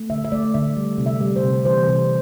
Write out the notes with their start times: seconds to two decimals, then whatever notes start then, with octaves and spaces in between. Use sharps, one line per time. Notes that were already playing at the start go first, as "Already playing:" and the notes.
Already playing: A3
0.10 D3 E5
0.25 E5
0.32 A3 D5
0.54 D3 E5
0.77 G3
0.98 C3
1.06 E5
1.21 G3
1.36 C5
1.43 C3
1.65 E3 C5
1.88 C3